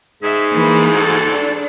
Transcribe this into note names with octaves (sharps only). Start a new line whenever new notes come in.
G#2 G#4 E5
E3 A#3
F#4 A4
D4